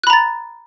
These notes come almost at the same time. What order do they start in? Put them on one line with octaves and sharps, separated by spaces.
F#6 B5 A#5 A6